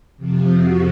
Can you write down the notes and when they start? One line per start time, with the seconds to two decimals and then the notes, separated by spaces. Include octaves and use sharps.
0.17 F2 C3 F3
0.60 F#4